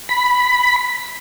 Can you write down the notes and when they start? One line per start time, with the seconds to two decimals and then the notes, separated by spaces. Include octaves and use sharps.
0.09 B5